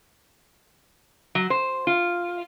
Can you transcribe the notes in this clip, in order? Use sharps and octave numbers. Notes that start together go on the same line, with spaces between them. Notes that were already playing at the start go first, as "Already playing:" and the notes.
F#3
C5
F4